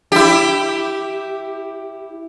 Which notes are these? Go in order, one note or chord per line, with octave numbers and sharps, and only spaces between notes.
E4 G4